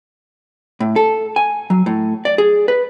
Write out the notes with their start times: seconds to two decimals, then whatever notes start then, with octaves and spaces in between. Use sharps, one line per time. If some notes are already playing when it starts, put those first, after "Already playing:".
0.80 A2
0.96 A4
1.36 G#5
1.70 F#3
1.86 A2
2.25 D5
2.38 G#4
2.68 B4